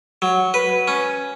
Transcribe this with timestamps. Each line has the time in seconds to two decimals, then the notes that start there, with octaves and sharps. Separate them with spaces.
0.22 F#3
0.54 B4
0.88 C#4